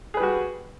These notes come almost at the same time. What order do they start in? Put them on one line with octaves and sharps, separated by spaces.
G#4 B4 G3 F#4